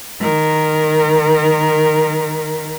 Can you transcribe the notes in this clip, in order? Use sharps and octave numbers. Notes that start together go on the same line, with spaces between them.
D#3 A#4